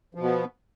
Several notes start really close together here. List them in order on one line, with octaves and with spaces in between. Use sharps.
F3 B2 B3